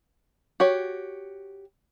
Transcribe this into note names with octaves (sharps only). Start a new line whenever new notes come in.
F#4 G4 C#5